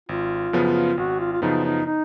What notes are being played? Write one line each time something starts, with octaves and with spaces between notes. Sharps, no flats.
G#1 F4
F#2 C#3 F3 B3
G#1 F#4
F4
F4
F#2 C#3 F3 B3 D#4
D#4
D#4